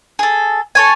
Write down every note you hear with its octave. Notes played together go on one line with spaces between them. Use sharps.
G#4 A4
A4 C#5 G#5